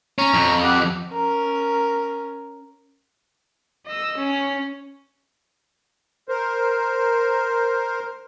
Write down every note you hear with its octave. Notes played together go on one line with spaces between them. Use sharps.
C#4 A#5 C#6
F2
G4 F#5
C#4 A#4
D#5 E6
C#4
A#4 C5